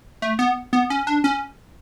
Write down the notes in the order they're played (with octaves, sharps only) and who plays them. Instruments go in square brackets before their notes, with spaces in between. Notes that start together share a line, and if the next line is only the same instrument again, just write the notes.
[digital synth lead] A3
B3
B3
C#4
D4
C#4